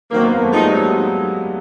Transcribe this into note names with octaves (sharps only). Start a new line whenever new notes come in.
D#3 F#3 A#3 C4
B3
A#3
A3
F3 G#3 A#3 D#4
G3
F#3